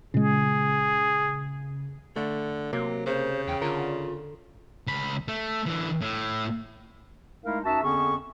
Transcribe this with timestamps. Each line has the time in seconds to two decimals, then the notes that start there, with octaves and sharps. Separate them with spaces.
0.14 A#2 C#3 G#3 G#4
2.16 D3 A3
2.73 C3 F#3 A#3
3.06 C#3 C5
3.47 E2 G5
3.62 D3 F4 A#4
4.87 C#2 B5
5.28 A3
5.66 D3 E3
6.01 A2
7.44 G#3 A3 D#4 E4 A#4 F5
7.64 F#2 D#4 F#4 E5 A5
7.83 F2 D3 B3 C#4 G#4 C#6